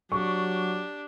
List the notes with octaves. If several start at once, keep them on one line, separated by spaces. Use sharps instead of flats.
F#3 D4 G4 C#6